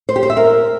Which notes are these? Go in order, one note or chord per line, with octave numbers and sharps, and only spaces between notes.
C5
G4
C5
E5
A#4